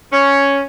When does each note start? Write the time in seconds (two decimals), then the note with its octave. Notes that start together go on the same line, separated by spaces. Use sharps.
0.12 C#4